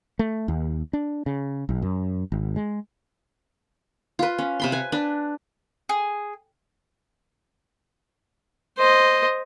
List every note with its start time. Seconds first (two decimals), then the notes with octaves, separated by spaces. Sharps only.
0.19 A3
0.48 D#2
0.93 D4
1.26 C#3
1.69 B1
1.82 F#2
2.32 G#1
2.56 G#3
4.19 F4 B4
4.38 C#4
4.60 C3 B5 C6
4.72 B4 G#5
4.92 D4 B4
5.89 G#4
8.78 C5 D#5